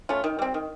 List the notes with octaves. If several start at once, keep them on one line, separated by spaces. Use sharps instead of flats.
A3 C#4 F4
D#3
G3 C4
D#3